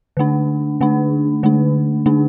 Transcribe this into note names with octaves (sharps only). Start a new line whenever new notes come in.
D3 A3 D4
D3 A3 D4
D3 A3 D4
D3 A3 D4